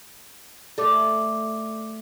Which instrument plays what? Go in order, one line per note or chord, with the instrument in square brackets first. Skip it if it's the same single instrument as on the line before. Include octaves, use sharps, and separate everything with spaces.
[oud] A3 [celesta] D5 D6